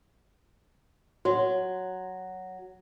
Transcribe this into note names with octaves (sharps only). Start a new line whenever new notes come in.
F#3 F#4